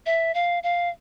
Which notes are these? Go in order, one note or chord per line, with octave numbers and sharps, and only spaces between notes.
E5
F5
F5